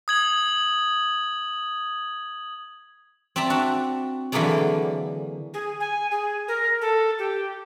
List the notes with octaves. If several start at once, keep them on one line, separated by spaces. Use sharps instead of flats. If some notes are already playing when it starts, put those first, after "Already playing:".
D#6 G#6 F#7
C4 D5 E5 A5 A#5
D4 F#4
D3 E3 F#3 A#3 G#4 D5
G#4
G#5
G#4
A#4
A4
G4